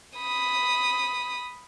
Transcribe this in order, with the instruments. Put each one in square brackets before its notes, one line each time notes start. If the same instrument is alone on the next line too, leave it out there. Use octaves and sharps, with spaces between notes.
[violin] B5 D#6